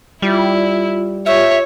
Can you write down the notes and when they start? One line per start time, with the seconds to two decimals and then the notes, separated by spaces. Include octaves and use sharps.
0.22 G3 E4 F4
1.26 F4 G4 C#5 E5